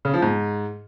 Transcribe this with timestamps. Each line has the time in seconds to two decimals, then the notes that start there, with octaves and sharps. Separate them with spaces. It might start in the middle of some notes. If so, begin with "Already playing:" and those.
0.05 C#3
0.14 F3
0.22 G#2